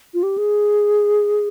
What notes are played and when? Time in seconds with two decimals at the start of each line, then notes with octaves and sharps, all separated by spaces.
0.14 F4
0.23 G4
0.38 G#4